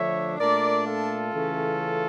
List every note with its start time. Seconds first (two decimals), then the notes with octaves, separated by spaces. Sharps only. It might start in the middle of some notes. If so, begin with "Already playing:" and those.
Already playing: D3 F3 A3 D4 C#5 E5
0.38 A#2 A3 D4 A#4 D5
0.87 F4 A4
1.33 C#3 E3 A3 C#4